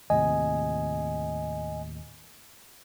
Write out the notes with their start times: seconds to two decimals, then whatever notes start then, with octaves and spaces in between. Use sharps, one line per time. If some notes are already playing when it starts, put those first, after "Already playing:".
0.10 D#2 A2 C3 D#5 G#5